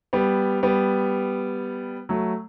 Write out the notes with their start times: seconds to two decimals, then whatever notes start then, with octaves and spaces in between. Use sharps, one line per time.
0.13 G3 B3
0.63 G3 B3
2.09 F#3 A3